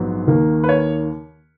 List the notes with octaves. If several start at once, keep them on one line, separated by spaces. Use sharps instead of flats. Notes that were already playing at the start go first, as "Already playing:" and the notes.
Already playing: A#1 G#2 F#3 B3
D#2 D#3 A#3
B4
C#5